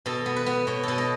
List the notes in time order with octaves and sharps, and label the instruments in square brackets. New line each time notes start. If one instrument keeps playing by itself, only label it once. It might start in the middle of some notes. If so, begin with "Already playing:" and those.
[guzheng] B2 A4
B3
B4
B3
B2 C#5
B2 A4
D#5